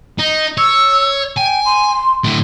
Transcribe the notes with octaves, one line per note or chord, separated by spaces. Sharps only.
D#4
C#5 E6
G5 G#5
C6
A2 D3